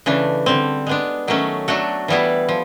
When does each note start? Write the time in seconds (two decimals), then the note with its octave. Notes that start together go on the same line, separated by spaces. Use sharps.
0.06 C#3 E3 A3 D4
0.46 D3 G3 C4
0.87 G#3 B3 D4
1.28 D#3 F#3 A3 C#4
1.68 F#3 A3 D4 F#4 A4
2.08 E3 G3 B3 E4
2.49 F3